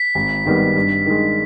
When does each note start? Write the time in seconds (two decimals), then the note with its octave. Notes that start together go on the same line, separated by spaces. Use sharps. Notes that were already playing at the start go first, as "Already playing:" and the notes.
Already playing: B6
0.15 G#1
0.45 G#2 D#3 G3 B3
0.76 G2
1.06 D#3 G#3